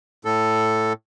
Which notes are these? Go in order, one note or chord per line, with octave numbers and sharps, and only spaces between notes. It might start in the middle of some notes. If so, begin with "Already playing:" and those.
A2 A4